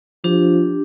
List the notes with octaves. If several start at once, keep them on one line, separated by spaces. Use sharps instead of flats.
F3 D4 G4